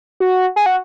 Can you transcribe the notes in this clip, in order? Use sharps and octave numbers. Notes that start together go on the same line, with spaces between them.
F#4
G#4
F#4